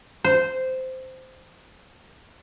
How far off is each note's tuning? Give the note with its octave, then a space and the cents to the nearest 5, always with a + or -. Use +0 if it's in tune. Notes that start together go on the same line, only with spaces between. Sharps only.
C5 -10